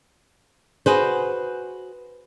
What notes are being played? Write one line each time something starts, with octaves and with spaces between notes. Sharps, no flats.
F#4 G#4 B4 C5